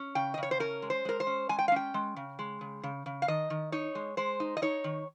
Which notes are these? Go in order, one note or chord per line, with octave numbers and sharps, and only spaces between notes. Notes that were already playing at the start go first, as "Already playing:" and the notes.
Already playing: C#4
C#3 G5
D#5
C#3
C#5
C5
C#4 A#4
G#3
C5
G#3 A#4
C5
C#4
G#3 G#5
G5
F5
C#4 G5
G#3
C#3
G#3
C#3
C#3
C#3
F5
D#3 D#5
D#3
D#4 C#5
G#3
G#3 C5
D#4
D#5
D#4 C#5
D#3